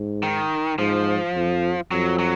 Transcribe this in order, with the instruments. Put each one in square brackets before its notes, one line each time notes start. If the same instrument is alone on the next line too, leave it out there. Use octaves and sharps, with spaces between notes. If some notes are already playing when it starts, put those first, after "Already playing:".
Already playing: [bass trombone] G#2
[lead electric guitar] D#3
[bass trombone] G#2 [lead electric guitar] F3
[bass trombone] F2
[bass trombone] F2 [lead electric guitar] F#3
[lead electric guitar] F#3